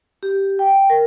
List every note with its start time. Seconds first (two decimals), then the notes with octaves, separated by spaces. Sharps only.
0.23 G4
0.59 G5
0.90 A#4